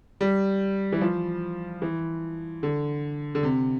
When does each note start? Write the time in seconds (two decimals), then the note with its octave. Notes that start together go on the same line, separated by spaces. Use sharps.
0.21 G3
0.92 E3
1.01 F3
1.82 E3
2.63 D3
3.35 D3
3.43 C3